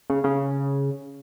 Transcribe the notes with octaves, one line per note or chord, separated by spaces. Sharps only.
C#3
C#3